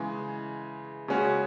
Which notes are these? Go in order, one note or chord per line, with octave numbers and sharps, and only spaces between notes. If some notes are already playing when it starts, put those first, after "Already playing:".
Already playing: C#3 E3 G#3
C#3 G#3 C#4 F#4